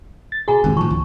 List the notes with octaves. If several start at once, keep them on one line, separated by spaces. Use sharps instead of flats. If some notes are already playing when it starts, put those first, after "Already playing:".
A6
B2 F#4 G#4 G#5 A#5
F1 G#2 C3 D#3
A2 F3 A5 C#6
C#2